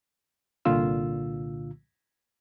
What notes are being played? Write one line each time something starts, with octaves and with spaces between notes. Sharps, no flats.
C2 A#2 D3 F4 E6